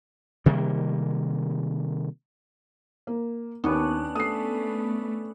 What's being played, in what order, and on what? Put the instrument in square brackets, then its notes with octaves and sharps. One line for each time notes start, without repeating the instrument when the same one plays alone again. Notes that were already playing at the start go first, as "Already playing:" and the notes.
[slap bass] C3 D#3 G3 A#3
[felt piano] A#3
[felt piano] D#2 [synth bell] B3 [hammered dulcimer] C#4 D4 B4
[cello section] A3 [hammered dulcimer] A4 [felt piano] D#6 C7